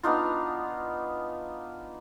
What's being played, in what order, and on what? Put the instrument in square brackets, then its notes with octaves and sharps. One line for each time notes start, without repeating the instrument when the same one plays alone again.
[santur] B3 D4 D#4 F4